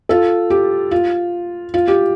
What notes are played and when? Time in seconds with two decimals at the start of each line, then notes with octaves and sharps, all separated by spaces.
0.09 F4 A4
0.50 G4
0.91 F4
1.74 F4
1.88 G4